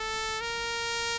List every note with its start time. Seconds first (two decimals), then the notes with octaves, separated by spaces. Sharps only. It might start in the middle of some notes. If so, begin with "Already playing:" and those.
Already playing: A4
0.41 A#4